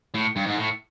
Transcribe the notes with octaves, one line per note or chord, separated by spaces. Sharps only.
A2
G2
G#2
A2